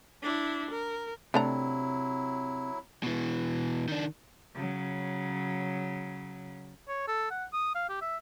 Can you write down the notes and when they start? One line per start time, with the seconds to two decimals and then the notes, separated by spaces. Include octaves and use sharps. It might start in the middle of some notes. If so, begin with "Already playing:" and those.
0.23 D4 E4
0.70 A#4
1.34 C3 F#3 A3 D4 E4 A#5
3.03 B2 E3
3.88 D#3 D4
4.55 C#3 F#3
6.88 C#5
7.08 A4
7.30 F#5
7.53 D#6
7.75 F5
7.89 G4
8.02 E5